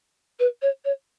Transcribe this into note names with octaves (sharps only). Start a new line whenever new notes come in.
B4
C#5
C#5